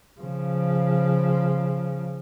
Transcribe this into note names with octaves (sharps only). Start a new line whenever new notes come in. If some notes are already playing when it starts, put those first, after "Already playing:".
C#3 F3